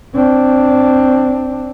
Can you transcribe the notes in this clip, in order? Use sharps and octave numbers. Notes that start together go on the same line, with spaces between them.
C4 D4